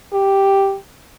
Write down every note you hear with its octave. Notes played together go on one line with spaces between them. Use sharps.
G4